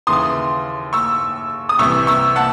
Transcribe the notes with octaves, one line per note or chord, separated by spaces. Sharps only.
D#2 C#3 E3 C6 D#6
C#6 E6
D#6
C2 C3 E3 C#6 E6
C#6 E6
F#5 A5